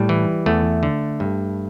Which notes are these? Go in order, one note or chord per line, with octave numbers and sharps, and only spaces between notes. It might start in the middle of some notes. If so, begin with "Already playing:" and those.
Already playing: A2 G3
E3
E2 A3
D3
G2